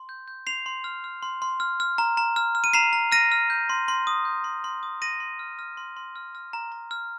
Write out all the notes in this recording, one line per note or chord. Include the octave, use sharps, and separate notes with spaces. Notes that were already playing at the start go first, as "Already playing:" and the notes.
Already playing: C6
G6
G6
C6 C7 F7
C6
F6
F6
C6
C6
F6
F6
A#5
A#5
F6
F6
D#7
A#5 C7 F7
A#5
F6 A#6 D#7
F6
G6
C6
C6
D#6
G6
C6
C6
D#6
C6 A#6 D#7
C6
F6
F6
C6
C6
F6
F6
A#5
A#5
F6